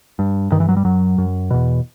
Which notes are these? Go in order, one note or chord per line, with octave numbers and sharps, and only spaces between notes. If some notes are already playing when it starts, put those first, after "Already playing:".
G2
G2 D#3
E3
F#3
G3
F#2 F#3
F#2
E2 B2